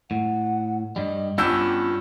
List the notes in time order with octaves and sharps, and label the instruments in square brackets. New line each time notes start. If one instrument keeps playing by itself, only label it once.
[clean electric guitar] A2 [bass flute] F#5
[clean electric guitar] G2 G3 [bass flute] D#5
[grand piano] G2 E6 G6 [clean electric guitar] B3 C#4 G4 [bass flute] F4